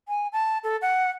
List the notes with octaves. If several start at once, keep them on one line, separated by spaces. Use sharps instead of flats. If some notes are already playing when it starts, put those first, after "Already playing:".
G#5
A5
A4
F#5